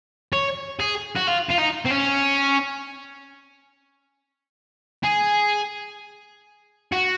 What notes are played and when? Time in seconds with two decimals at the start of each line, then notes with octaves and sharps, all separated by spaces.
0.33 C#5
0.80 G#4
1.16 F#4
1.27 F4
1.49 F4
1.58 D#4
1.85 C4
1.90 C#4
5.03 G#4
6.92 F#4